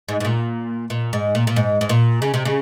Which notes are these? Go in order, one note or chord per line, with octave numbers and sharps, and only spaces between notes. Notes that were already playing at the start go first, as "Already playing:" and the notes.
G#2
G#2
A#2
A#2
G#2
A#2
A#2
G#2
G#2
A#2
C#3
C3
C#3